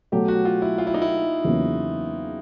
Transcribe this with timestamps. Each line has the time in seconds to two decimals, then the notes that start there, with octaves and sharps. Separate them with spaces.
0.12 B2 F#3 A3 G4
0.28 F#4
0.45 F4
0.62 E4
0.78 F4
0.87 E4
0.94 D#4
1.02 E4
1.45 E2 C#3 F#3 A#3 C#4